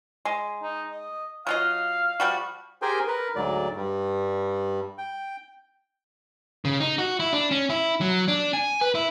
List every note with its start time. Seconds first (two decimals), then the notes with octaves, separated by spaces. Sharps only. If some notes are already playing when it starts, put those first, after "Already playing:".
0.25 G#3
0.62 D#4
0.92 D#5
1.47 F#3 F4 D#5 F5
2.20 F3 G3 F#4
2.82 G4 G#4 A#4 C5 G5 G#5
3.07 A#4 B4
3.36 D2 G#2 F#3 D5
3.76 G2 G3
4.98 G5
6.65 C#3
6.80 D#4
6.98 F#4
7.20 E4
7.33 D4
7.51 C#4
7.70 E4
8.01 F#3
8.28 D4
8.53 G#5
8.81 B4
8.95 E4